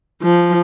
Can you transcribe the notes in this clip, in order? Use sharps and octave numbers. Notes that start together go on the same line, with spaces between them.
F3